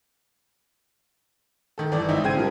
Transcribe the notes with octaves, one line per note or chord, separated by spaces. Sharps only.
D#3 A4
G1 E3 D5
G#1 D#4 E4
C#3 C5 G5 G#6 D#7
C#3 F3 G3 A#4